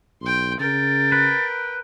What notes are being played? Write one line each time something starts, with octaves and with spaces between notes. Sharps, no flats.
B1 G5 C6
C#3 A#4 G5 A6
B4